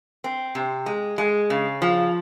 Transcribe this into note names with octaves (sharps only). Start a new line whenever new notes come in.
C4
C3
G#3
G#3
C#3
F3